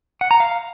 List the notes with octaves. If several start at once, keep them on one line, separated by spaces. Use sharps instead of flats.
F#5
A#5
F5